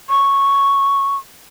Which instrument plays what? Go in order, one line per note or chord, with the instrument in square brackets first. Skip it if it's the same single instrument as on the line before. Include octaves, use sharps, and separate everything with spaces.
[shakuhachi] C#6